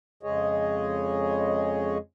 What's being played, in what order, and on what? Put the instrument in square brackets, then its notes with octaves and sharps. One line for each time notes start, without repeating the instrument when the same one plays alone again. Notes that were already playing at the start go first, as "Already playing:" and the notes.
[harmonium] F2 C#3 G#3 G#4 C#5 D#5